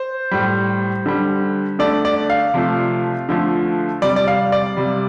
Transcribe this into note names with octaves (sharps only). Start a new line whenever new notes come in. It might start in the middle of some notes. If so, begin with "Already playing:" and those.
Already playing: C5
A2 G3
D3 G3
D3 A3 D5
D5
F5
C3 F3 A3
D3 F3 A3
C3 G3 D5
D5
F5
D5
C3 G3